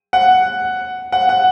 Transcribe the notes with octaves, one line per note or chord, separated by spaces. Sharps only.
F#5
F#5
F#5